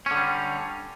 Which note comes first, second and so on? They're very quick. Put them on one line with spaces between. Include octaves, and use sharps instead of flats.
C#4 D3 G3